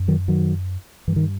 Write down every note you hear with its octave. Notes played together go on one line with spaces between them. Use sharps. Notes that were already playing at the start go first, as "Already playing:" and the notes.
Already playing: F#2
D#3 F#3
D#3 F#3
G2 E3
D#3